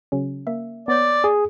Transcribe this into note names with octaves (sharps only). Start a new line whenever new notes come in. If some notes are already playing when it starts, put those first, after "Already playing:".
C#3 F#3 C#4
A#3 E5
B3 C#5 D5 G6
G#4